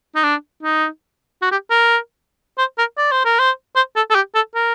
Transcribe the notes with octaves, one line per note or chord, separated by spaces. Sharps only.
D#4
D4
D#4
F#4
G4
A#4
C5
A#4
D5
C5
A#4
C5
C5
A4
A4
G4
A4
A#4